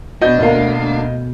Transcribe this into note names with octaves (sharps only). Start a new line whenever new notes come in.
B2 B3 D4 F#4 D#5 G6
D2 B2 A#3 F5